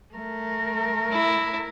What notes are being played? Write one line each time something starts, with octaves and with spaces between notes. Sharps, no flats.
A3 A#4
E4